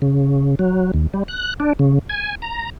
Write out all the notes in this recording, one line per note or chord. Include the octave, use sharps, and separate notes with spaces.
C#3
F#3
D#2
G3
F#6
D4
C#3
G#5
A#5